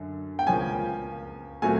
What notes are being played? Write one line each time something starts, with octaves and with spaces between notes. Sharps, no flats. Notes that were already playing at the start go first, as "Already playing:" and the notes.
Already playing: F#2 D3
G5
C#2 C#3 F3 A#3 C#4 G#5
A#2 F#3 A3 C4 G#5